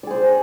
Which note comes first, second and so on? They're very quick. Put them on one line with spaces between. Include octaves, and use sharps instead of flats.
D5 G#4 C5